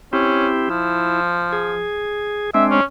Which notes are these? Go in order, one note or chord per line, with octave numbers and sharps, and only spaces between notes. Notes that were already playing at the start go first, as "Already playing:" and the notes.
C4 C#4 E4 G4
F3 E4
G#4
G#3 C4 D4 E5
C#4